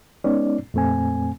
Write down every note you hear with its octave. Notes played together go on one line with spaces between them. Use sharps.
G#3 B3 C#4 D#4 D5
F2 A#2 A3 C4 G#5